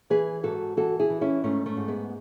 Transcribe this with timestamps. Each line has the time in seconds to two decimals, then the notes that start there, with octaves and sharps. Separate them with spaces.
0.10 E3 G#4 B4
0.43 G#2 F#4 A4
0.77 E3 F#4 A4
0.99 E4 G#4
1.10 E3
1.21 C#4 E4
1.44 G#2 A3 C#4
1.66 A3 C#4
1.77 G#2
1.88 G#3 B3